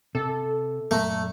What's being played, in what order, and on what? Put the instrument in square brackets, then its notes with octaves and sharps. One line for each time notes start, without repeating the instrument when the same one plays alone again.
[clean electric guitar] C3 [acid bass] A4
[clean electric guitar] F#2 A#2 A#5 [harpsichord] A3